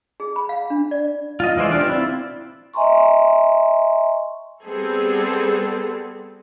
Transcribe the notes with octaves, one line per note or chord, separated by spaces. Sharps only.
G#4
B5
F5
D4
D5
F4 D#5
E3 G#3 C5 D5
D4 F4 G4 D5
C4 E4 F4
D#5 E5 G#5 A#5 C6 C#6
G3 B3 C4 G#4 A4